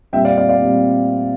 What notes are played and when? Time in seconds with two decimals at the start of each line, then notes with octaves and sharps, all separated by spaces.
0.13 A#2 G3 C4 E5 G5
0.25 D5 F5
0.37 D5 F5
0.49 D5 F5
0.62 A#2 G3 C4